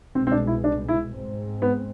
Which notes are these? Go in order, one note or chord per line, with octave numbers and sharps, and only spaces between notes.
C2 B2 G#3 C4
C4
D4
E4
D4
E4
G#2 G#3 C4
B3